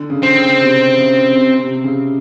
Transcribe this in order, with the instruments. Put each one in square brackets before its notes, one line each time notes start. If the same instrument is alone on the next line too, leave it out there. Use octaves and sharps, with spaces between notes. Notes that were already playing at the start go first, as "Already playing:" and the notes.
Already playing: [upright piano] D3
C#3
[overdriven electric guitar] C4
[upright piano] C#3
C3
C#3
C3
C3
C#3